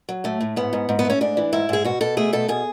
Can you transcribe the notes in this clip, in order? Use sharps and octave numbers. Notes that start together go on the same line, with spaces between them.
F#3
A2 A3
A2
G#2 B3
G#2
G#2
B3
A3 C#4
G#2 D4
E3
G#2 E4
G#2 G#4
B2 F#4
B2 A4
A3 G#4
B2 A4
B2 G#4